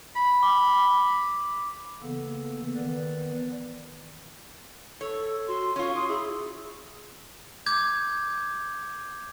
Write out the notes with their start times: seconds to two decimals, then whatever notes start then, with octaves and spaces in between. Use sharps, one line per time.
0.16 B5
0.43 D6
2.02 C#3 E3 A#3 B3 A4
2.75 D#3 E3 B3 B4 D5
5.01 A4 C#5
5.48 F#4 C6
5.76 C#4 F4 C#5 C#6
5.95 C6 D#6
6.08 E4 G#4
7.66 D6 G6 G#6